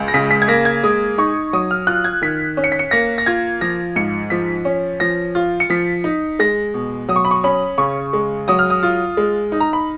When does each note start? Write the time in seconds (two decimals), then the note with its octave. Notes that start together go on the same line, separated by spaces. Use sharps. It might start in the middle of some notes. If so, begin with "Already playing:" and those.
Already playing: C#2
0.08 A#6
0.14 C#3 B6
0.31 B6
0.42 G#6
0.48 A#3 A#6
0.65 G#6
0.84 G#3 D#6
1.18 D#4 C#6
1.53 F#3 D#6
1.71 F6
1.87 F4 F#6
2.04 G#6
2.22 D#3 B6
2.57 C#4
2.64 C#7
2.72 B6
2.79 C#7
2.91 A#3 A#6
3.18 A#6
3.26 F4 G#6
3.61 F3 A#6
3.96 G#2 C#7
4.30 F3 B6
4.65 C#4
5.00 F3 A#6
5.35 F4
5.60 C#7
5.70 F3 B6
6.04 D#4
6.39 G#3 A#6
6.74 B2
7.09 F#3 D#6
7.16 C#6
7.25 B5
7.31 C#6
7.44 C#4 B5
7.78 C#3 C#6
8.13 G#3
8.48 F#3 D#6
8.59 F6
8.70 D#6
8.83 F4
9.17 G#3
9.52 D#4
9.60 A#5
9.73 B5